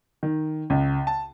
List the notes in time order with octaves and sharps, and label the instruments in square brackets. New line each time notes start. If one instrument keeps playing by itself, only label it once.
[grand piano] D#3
C#2
A5